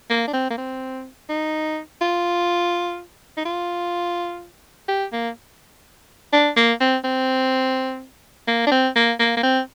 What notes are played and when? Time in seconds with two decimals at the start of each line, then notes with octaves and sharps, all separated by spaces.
0.10 A#3
0.28 D4
0.33 C4
0.50 A#3
0.58 C4
1.29 D#4
2.01 F4
3.37 D#4
3.45 F4
4.88 G4
5.12 A#3
6.33 D4
6.56 A#3
6.80 C4
7.04 C4
8.48 A#3
8.67 D4
8.71 C4
8.96 A#3
9.19 A#3
9.37 A#3
9.43 C4